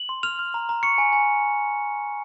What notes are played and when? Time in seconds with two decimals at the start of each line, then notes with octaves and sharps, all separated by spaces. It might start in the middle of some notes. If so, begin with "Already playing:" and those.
Already playing: F#7
0.09 C6
0.23 F6 F7
0.39 F6
0.54 A#5
0.69 A#5
0.83 C#6 C#7
0.98 G#5
1.13 G#5